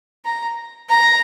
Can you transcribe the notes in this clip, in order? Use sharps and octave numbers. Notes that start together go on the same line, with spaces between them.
A#5
A#5